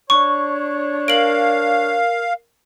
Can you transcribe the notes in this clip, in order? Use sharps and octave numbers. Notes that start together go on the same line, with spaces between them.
D4 C#5 C#6
A#4 F5 D7 F#7